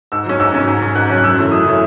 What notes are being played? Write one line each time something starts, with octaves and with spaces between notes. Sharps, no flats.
G#2 E6
F#3 C#4
G#2 E6
F#3 C#4
G#2
F#3 C#4
G#2 F#6
F#3 C#4
F#6
F#2 E6
E3 A3 C#4
F#2 D#6
E3 A3 C#4